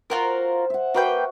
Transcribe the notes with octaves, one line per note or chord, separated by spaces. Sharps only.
F4 F#4 A#4 C5
E5 F#5
A#3 F#4 B4 G5